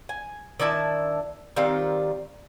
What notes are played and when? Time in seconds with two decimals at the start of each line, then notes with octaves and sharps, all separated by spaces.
0.09 G#5
0.60 D#3 D4 E4 A5
1.56 D#3 G3 C4 F4